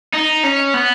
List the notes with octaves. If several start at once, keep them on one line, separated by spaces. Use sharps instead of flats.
D#4
C#4
B3